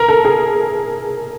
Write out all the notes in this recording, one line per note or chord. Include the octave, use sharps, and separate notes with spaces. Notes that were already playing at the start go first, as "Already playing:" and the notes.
Already playing: A#4
A4
G#4